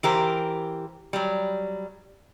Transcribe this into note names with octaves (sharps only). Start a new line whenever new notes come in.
E3 G4 A#4 C5
F#3 G3